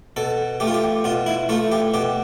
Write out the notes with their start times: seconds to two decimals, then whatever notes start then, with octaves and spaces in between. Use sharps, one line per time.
0.16 B2 A4
0.60 A3 G4
0.67 F4
0.74 G4
1.04 B2 F4
1.26 E4
1.49 A3 F4
1.72 G4
1.94 B2 G4